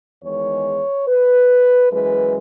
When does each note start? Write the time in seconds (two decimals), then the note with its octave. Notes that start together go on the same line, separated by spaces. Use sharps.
0.22 E2 D#3 G#3 C#5
1.08 B4
1.91 F#2 E3 G#3 B4